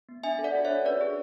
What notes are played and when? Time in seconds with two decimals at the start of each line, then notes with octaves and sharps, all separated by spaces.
0.09 B3
0.23 D4 E5 G#5
0.39 A4
0.44 D5 F#5
0.55 F#4
0.65 C#5 E5
0.70 D4
0.85 C#4 B4 D5
1.01 G#4